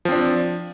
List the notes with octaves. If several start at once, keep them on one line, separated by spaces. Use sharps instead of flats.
F3 C4 D4